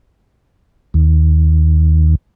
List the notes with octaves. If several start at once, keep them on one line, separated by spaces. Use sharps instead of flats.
D#2